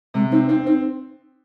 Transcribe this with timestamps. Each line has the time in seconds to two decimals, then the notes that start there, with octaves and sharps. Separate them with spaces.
0.14 C3 G#3
0.32 C4 D#4
0.49 C4 D#4
0.66 C4 D#4